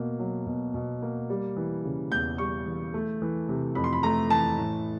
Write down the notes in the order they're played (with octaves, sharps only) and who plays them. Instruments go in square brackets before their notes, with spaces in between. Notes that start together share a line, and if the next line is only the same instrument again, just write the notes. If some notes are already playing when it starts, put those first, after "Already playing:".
Already playing: [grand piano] B2 A#3
F#3
B2
B2
A#3
G3
E3
C#3
E2 G6
G3 C#6
E3
A3
E3
C3
F2 B5
C6
B5
A3 A#5
E3 A5
A2